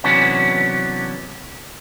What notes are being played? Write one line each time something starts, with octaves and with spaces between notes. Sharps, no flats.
C3 E3 F#3 B3 C#4 D4